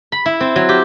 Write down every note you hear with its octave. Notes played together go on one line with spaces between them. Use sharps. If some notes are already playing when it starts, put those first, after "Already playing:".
B5
E4
C4
F#3
G4